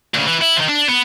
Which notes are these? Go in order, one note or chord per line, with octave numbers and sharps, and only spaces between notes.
D2 C#3
E3
E4
D#3 F3
D4
B3